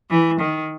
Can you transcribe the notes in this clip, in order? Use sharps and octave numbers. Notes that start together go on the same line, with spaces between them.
E3
D#3